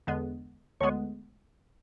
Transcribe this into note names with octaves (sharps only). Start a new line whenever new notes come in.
E2 D3 G#3 B3
D2 D3 G#3 B3 C#5